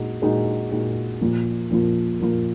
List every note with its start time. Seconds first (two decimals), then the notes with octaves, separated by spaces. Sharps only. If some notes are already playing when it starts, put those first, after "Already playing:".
Already playing: A#2 G#3 D#4 F#4
0.22 A#2 G#3 D#4 F#4
0.72 A#2 G#3 D#4 F#4
1.21 A#2 F3 A#3 F4
1.70 A#2 F3 A#3 F4
2.20 A#2 F3 A#3 F4